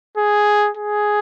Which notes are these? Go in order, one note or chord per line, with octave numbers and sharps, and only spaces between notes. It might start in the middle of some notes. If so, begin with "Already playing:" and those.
G#4
G#4